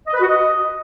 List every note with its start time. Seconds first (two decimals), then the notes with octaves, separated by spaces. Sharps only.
0.07 D#5
0.14 B4
0.21 F#4
0.27 D#5